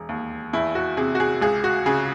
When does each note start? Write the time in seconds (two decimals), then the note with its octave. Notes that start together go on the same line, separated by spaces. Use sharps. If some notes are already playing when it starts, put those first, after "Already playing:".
Already playing: E1
0.09 D#2
0.53 E2 E4
0.75 F#4
0.97 C3 G#4
1.15 F#4
1.20 G#4
1.42 C#2 G#4
1.64 F#4
1.86 C#3 G#4